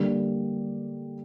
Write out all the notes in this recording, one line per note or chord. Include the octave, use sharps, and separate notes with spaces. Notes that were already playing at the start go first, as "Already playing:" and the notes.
Already playing: D3 G3 A#3